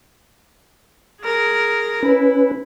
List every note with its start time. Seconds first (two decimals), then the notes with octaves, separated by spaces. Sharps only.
1.23 G#4 A#4
2.03 C#4 E4 B4